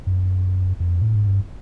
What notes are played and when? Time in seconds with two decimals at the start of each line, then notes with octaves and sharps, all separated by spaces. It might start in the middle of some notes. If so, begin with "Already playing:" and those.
0.07 F#2
0.80 F2
1.02 A2
1.15 G#2
1.27 G2